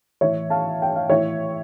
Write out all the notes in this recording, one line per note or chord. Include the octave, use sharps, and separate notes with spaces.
A2 E3 C#5 E5
F5 A5
G5
F5
A2 E3 C#5 E5